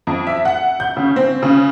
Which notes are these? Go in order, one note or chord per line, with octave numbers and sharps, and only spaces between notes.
F2
E5
F#5
G6
C#3
C4
C#3